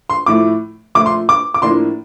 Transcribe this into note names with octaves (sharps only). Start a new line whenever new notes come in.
C6
A2 F3 A3 D6
A#2 F3 A3 D6
C6
D6
D6
A2 F3 A#3 D4 C6